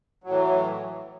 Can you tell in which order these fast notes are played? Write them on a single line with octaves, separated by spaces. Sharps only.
F#3 A2 E3